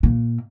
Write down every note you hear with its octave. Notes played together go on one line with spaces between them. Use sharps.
A#2